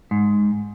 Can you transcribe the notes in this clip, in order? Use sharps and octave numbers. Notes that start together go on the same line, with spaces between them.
G#2